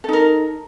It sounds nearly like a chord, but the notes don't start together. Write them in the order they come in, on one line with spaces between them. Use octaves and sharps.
A4 D#4 A#4